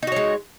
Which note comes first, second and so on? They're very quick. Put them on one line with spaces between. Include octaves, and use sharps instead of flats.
D#4 F#4 C#5 G#3